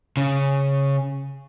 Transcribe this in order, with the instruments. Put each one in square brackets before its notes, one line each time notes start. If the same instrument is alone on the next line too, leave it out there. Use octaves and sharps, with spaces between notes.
[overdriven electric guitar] C#3